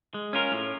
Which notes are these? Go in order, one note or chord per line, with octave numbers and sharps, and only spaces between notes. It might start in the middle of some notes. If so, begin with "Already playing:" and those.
G#3
C#4 F4 A#4
A2